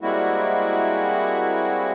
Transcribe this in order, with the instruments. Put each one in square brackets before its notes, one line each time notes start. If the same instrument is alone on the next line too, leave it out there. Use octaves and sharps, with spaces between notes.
[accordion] G3 G#3 A#3 C4 E4 F#4